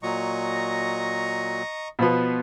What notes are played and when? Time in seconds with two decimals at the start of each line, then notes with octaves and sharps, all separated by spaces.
0.03 A#2 F#3 D#5 A#5 C#6
1.99 B2 F3 B3